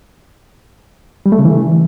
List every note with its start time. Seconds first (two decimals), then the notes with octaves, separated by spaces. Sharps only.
1.26 G3
1.32 A3
1.39 C#3
1.45 E3